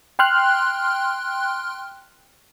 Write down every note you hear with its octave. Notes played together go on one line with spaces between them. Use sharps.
G5 C6 F6 F#6